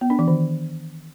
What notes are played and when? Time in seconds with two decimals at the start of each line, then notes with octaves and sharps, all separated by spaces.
0.01 B3
0.10 D4
0.19 E3
0.28 D#3